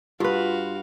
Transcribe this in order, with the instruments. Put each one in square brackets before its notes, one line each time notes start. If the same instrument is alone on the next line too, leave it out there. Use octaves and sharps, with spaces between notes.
[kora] G2 B4 [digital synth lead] F4 [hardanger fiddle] F#4 F5